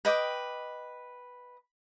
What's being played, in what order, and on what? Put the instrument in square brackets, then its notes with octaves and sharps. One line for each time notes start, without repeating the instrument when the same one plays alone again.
[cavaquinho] B4 D#5 G5 D6